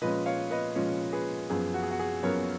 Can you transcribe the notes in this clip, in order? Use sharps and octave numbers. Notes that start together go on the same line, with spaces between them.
A#2 F3 G#3 C#4 B4 D#5
C#5 F5
B4 D#5
A#2 F3 G#3 C#4
G#4 B4
F#2 F3 B3 G#4
F#4
G#4
F#4
G#4
F#2 F3 B3 A#4 C#5